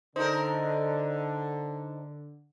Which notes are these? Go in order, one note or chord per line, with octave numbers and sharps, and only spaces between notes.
D3 D#4 A4 A#4 C5